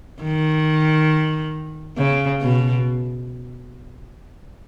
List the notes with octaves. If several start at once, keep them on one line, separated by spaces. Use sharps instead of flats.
D#3
C#3
B2